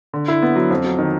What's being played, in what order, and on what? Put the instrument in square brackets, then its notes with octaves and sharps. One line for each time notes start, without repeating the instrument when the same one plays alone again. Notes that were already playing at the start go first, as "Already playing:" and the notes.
[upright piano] D3
E4
B3
F#3
F2
F#3
D#3